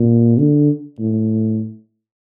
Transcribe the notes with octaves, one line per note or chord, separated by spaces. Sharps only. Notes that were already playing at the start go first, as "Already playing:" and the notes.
Already playing: A#2
D3
A2